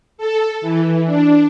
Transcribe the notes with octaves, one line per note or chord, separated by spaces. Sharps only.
A4
E3
D4